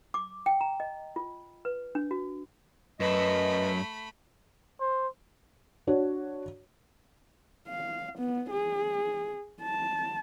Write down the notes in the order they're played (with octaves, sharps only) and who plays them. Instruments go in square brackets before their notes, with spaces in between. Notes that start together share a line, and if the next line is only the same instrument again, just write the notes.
[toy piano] D6
G5
A#5
D#5
F4
B4
D4
F#4
[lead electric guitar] F#2 [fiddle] A3 B5 [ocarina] B4 [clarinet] D#5
[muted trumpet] C5
[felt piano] D4 F#4 C#5
[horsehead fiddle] F5
B3
G#4
A5